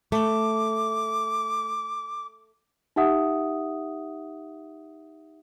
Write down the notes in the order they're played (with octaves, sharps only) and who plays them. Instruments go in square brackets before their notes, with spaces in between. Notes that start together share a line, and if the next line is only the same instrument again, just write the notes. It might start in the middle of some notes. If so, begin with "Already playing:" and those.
[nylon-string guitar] A3 [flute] D6
[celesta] D#4 G4 E5 F#5 D#6